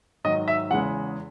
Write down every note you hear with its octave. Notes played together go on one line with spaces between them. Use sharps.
G#2 D#3 F#3 D#5
E5
E2 C#3 G#3 F#5